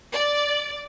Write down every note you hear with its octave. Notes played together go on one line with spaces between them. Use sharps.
D5